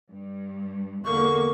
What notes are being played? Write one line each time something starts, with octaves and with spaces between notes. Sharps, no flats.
G2
E2 D3 A#3 C#6